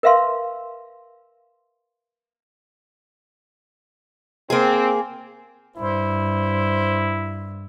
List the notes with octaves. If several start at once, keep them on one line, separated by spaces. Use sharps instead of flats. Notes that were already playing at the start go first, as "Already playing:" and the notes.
A#4 B4 E5 F5 C6
A#3 C4 G#4
G2 E4 C5